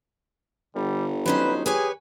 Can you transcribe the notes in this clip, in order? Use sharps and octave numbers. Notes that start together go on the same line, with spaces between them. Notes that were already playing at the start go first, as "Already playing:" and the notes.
G1 D3 G3
F#3 C#4 D#4 B4 C5
G4 G#4 B4 C#5 G#5